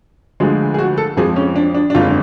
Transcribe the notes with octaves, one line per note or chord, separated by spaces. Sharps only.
D2 D3 F3 G#3
G#4
F#4
A4
F2 F3 G#3 G#4
C#4
D4
D4
D4
F#1 F2 D3 G#3 F4